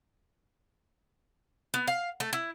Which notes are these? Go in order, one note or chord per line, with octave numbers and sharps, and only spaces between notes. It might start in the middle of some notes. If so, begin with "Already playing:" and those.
B3
F5
A3
E4